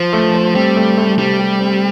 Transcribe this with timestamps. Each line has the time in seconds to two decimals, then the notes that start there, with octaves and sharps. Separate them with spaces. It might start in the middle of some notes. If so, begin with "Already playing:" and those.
Already playing: F3 C5
0.13 A3
0.34 C5
0.55 G3 C4
0.76 A3
0.97 A3
1.18 C3 G3
1.39 G4
1.60 C4